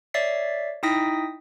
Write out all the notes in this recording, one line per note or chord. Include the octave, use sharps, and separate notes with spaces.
C#5 D5 E5 A6 B6 C7
D#4 E4 G5 D#6 A#6 B6